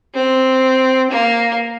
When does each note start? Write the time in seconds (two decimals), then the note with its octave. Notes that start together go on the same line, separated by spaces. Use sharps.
0.14 C4
1.10 A#3